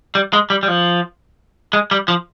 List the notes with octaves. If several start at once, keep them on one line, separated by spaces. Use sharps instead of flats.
G3
G#3
G3
G3
F3
G#3
G3
F3